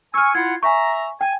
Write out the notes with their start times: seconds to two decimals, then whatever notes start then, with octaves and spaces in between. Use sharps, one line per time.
0.14 G#5 C#6 E6 F6
0.35 E4 F4 F#5 G#6
0.63 E5 G#5 A#5 C#6
1.21 G5 G#5